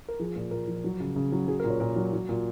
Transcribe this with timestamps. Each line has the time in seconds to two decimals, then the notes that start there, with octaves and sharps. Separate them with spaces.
0.08 A#4
0.19 F3 G#4
0.36 A#2
0.51 A#2 A#4
0.67 F3
0.84 F#3
1.00 C#3
1.16 C#3
1.32 F#3
1.48 F#3 G#4
1.60 A#4
1.64 A#2
1.70 C#5
1.80 A#2 A#4
1.96 F#3
2.13 F#3
2.29 A#2